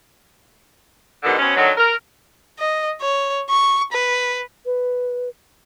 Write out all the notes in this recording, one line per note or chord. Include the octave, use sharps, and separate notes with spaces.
G#2 B2 D3 D#3
B2 C4 C#4
D3 D#3 F#3
A#4
D#5
C#5
C#6
B4
B4